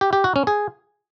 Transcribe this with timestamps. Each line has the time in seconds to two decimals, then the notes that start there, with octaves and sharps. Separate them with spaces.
0.01 G4
0.13 G4
0.24 F#4
0.36 C#4
0.47 G#4